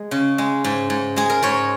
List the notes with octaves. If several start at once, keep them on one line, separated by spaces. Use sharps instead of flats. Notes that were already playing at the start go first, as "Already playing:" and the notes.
Already playing: G#3 G#4
C#3
G#3
G#2
G#2
G#3 G#4
A#4
G#2 C#5